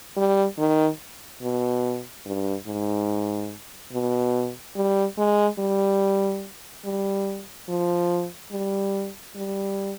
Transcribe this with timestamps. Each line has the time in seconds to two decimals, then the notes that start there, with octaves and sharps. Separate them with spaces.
0.17 G3
0.59 D#3
1.42 B2
2.26 G2
2.67 G#2
3.93 B2
4.76 G3
5.18 G#3
5.59 G3
6.85 G3
7.69 F3
8.51 G3
9.36 G3